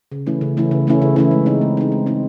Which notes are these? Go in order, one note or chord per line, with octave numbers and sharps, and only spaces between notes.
C#3
E3 A3 C#4 E4
C#3
E3 A3 C#4 E4
C#3
E3 A3 C#4 E4
C#3
E3 A3 C#4 E4
G#3
C4 D#4
G#3
C4 D#4
G#3
C4 D#4